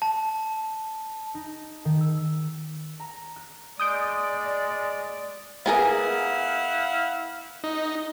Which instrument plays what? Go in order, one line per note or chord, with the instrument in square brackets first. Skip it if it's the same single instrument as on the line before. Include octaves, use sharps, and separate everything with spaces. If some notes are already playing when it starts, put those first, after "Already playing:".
[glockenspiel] A5
[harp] D#4
D#3
E6
A#5
F#6
[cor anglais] G#3 [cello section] D5 [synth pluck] D#6 G6 D7
[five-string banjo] B3 G#4 A#4 [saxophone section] E4 F5 F#5
[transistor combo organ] D#4